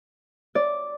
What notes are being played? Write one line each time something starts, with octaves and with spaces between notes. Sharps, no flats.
D5